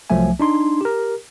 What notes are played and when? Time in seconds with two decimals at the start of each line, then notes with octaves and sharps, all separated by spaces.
0.10 C2 F3 F#3 A3 E5 G#5
0.40 D4 D#4 C6
0.81 G4 A#4